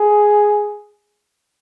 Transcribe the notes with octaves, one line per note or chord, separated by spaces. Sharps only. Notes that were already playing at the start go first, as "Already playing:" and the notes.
Already playing: G#4